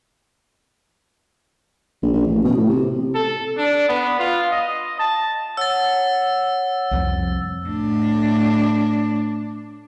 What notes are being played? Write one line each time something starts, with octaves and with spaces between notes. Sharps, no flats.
A#1
A#1
A1
B2
A2
C3
A4
D4
B3
F4
D#5
A5
C#5 F#5 E6 A6
C2 F2 F3
A2 D4